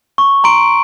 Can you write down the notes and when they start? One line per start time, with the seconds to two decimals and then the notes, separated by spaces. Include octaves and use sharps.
0.18 C#6
0.44 A#5 C6 D7